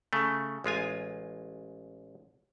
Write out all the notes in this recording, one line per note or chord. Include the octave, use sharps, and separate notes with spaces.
C#3 A3
A1 G#3 F4 G#5